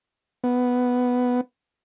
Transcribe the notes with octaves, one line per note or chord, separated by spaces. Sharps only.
B3